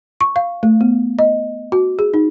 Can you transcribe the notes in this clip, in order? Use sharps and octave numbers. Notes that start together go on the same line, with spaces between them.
C#6
F5
A3
B3
D#5
F#4
G#4
D#4